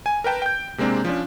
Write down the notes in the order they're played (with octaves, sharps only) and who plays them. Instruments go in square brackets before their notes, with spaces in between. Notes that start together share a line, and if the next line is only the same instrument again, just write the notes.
[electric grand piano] G#5
A#4 B4 G5 A5
G5 G6
C3 G#3 A#3 C4 D4
F3 C#4 D4